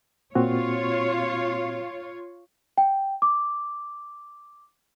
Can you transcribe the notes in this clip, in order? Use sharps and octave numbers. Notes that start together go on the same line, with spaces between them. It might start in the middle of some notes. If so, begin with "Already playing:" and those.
A#2 C4 F4 F#4 C#5
G5
D6